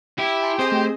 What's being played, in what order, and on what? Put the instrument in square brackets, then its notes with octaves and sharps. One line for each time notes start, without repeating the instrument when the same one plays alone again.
[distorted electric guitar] E4 [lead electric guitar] G4
[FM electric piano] G#5 A5 C6
[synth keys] C4 G#4 D#5 [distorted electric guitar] C5 [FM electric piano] D#6
[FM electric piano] A3